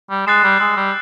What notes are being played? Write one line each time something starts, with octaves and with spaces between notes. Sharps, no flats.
G3
G#3 F#6 A6 C7 E7
G3
G#3 E6
G3